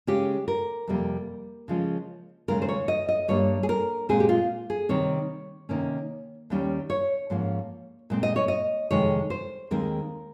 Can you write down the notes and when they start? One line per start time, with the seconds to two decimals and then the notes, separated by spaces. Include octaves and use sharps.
0.07 C#3 G#3 C#4 G4
0.48 A#4
0.88 F2 C3 G3 A#3
1.68 C#3 F3 G#3 C#4
2.48 D#2 C#3 G#3 C#4 A#4
2.62 C5
2.69 C#5
2.88 D#5
3.09 D#5
3.28 G2 G3 A#3 C#5
3.63 G#4
3.69 A#4
4.09 A#2 G#3 C4 G#4
4.20 G4
4.29 F4
4.70 G#4
4.89 C3 D#3 G3 C4 C#5
5.69 C3 D#3 A#3 C#4
6.50 D#2 D#3 G3 C#4
6.90 C#5
7.30 G#2 F3 A#3 C#4
8.10 A#2 G#3 C4
8.23 D#5
8.36 C#5
8.48 D#5
8.91 F2 C3 D#3 G#3 C#5
9.30 C5
9.71 D#2 D#3 G#3 C4 A#4